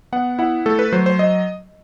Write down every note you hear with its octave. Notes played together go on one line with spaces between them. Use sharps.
B3 F#5
E4 F#5
A3 A4
B4
F#3 C5
C5
D#5